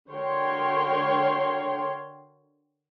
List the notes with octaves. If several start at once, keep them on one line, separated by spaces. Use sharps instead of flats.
D3 F#4 A#4 C#5 G5 C6